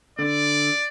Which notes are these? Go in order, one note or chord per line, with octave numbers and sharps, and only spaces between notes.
D3 D5